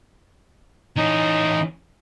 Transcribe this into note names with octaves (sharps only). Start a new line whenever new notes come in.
E3 C#4 D#4